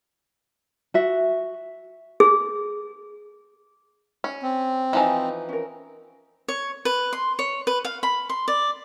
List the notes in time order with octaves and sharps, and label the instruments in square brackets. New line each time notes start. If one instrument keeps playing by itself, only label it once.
[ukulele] F#4 E5
[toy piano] G#4
[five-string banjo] C#4
[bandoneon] C4
[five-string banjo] E3 F3 D#4 [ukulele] G#5 A#5
[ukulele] C#4 A#4
[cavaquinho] C#5
B4
C6
C#5
B4
F5
B5
C6
D5